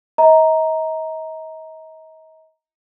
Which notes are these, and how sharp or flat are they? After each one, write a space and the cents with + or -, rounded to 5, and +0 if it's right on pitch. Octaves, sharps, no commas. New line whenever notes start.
D#5 +40 A#5 +0